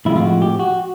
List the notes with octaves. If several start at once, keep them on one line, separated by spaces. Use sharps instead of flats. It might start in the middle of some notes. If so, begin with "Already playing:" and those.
A2 F3 G#3 C4 E4
F4
F#4
G4
F#4